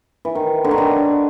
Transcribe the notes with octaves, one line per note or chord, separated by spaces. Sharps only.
E3
D#3
D3
D#3
D3